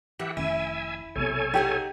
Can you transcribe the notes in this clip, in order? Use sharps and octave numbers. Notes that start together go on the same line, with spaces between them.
E3 G4 E5 F#5
F1 D#3 C#4 E4 E5 G#5
B1 C3 B3 A4 C#5 G#5
D#4 G4 G#4 F#5